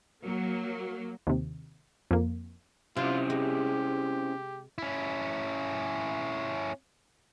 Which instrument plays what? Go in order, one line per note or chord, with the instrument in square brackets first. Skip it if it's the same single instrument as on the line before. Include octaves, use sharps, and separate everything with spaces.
[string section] F#3 A#3
[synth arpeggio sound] D#2 C3
F2 A#3
[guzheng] C3 [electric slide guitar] C4 C#4 E4 [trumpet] F4
[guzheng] G#3 [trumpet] G4
[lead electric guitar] C#4 E4